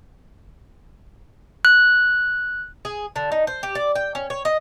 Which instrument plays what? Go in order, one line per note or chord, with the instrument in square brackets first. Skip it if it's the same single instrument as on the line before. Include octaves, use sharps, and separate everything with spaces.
[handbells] F#6
[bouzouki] G#4
D3
D#4
C5
G4
D5
G5
C#4
C#5
D#5